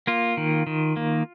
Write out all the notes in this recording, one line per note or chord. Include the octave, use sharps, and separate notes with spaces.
A#3 F4
D#3
D#3
A#3